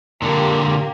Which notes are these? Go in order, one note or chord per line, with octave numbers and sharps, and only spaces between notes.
A#2 D3 A#3 G4